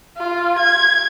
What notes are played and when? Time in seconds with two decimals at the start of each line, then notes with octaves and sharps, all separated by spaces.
0.17 F4
0.59 G#6